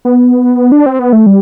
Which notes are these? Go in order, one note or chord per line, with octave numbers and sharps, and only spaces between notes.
B3
D4
C4
B3
A3
G3